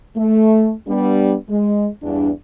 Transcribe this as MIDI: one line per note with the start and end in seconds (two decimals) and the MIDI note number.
0.16 0.72 57
0.87 1.34 55
0.87 1.34 59
0.87 1.34 62
1.49 1.87 56
2.03 2.29 40
2.03 2.29 43
2.03 2.29 62